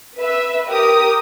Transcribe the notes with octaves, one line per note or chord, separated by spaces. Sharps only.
B4 E5
G4 A#4 D#6